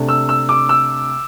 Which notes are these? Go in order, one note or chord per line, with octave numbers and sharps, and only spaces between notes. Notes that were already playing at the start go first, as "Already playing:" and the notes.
Already playing: C3 A3 D4
E6
E6
D6
E6